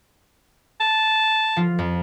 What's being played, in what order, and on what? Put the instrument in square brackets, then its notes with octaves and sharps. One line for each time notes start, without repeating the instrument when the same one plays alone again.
[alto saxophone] A5
[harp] F3 F4
F2